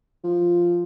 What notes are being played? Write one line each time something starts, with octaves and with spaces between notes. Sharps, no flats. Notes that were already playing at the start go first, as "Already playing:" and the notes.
F3